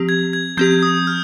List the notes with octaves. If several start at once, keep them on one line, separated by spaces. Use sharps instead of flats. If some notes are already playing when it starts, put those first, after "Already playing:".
Already playing: F3 C4 G4
G#6
G#6
F3 C4 G4 G6
D#6
F6